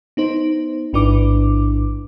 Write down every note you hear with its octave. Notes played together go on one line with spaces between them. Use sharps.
B3 D#4 C5
A1 G#2 D4 E4 B4 D6